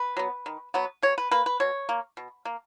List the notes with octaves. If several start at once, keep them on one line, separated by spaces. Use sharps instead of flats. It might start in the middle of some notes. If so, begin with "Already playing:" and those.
Already playing: B4
F#3 B3
D#3
F#3 B3
B2 C#5
B4
A#3 B4
B4
B2 C#5
A#3
B2
A#3